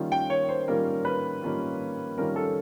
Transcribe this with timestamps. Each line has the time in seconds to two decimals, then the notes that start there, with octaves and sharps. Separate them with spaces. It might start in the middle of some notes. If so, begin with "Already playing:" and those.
Already playing: D#3 G3 A#3 C#4 F4
0.12 G5
0.30 C#5
0.49 C5
0.68 D#3 G3 A#3 C#4 F4 A#4
1.05 B4
1.42 D#3 G3 A#3 C#4 F4
2.17 D#3 G3 A#3 C#4 F4 A#4
2.36 A4